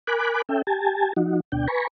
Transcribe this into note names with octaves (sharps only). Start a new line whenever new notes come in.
A#4 G#5 B5 D6 F#6
C#4 A4 E5 G5
G4 G#5 A5
F3 D#4 F#4
D2 B2 D4 G5
B4 G#5 A#5 B5 C#6